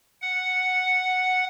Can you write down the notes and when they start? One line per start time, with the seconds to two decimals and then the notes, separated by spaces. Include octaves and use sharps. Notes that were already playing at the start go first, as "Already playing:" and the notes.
0.21 F#5